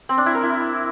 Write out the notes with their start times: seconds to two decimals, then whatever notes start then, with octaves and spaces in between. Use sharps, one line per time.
0.09 C4
0.18 D4
0.26 E4
0.35 A#4
0.43 E4